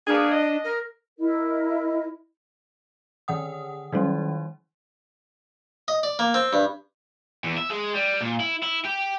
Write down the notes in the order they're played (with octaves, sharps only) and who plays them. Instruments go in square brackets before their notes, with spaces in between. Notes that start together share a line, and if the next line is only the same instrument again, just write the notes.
[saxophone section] A#3 B3 G#4 [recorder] D4
[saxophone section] D#5
[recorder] A#4
[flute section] E4 A#4 D#5
[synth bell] D3 D#3 F#5 D#6
D#3 F#3 G3 C#4
[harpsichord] D#5
D5
A#3
C4
G2
[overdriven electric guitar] E2
E5
G#3
G3
A#2
E4
E4
G4